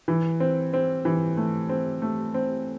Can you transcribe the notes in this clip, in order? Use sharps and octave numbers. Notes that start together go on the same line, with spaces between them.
E3
C4
C4
E3
A3
C4
A3
C4